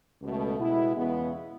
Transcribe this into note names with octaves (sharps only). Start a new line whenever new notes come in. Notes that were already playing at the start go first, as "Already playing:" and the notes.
C#2 B2 A3
B2 G#3 B3 E4
E2 C#3 G#3 B3